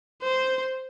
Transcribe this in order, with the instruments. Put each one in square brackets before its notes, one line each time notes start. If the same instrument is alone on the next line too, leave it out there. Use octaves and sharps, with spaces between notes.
[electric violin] C5